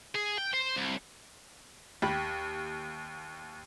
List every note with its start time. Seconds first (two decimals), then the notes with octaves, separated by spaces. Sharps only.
0.15 G#4
0.38 G5
0.54 C5
0.77 C2
2.02 D#2 G4 B5